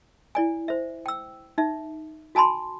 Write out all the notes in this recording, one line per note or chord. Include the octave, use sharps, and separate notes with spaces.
E4 D5 G#5
C5 E5
G5 E6
D#4 E5
F#4 G#5 A5 B5 C6